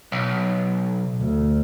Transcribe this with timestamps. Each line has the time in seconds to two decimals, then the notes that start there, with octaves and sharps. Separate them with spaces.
0.12 B1
1.19 D2